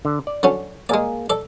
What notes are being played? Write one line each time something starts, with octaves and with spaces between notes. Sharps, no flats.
D3
D5
D3 F#3 C#4
G#3 A#3 G#4 D5
A4 D5